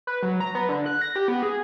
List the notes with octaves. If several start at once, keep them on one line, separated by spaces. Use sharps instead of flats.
B4
F#3
A#5
B3
D3
F#6
A#6
G4
B3
G#4